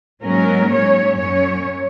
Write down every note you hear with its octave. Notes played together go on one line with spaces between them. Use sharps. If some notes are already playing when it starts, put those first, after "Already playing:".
G#2 F#3 A#3 C#4 A#4
G#2 F#3 C#4 C#5
F#2 F#3 C#4 C#5